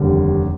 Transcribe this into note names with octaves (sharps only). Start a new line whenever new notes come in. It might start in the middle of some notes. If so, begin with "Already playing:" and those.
Already playing: F1 D#2 D3 G3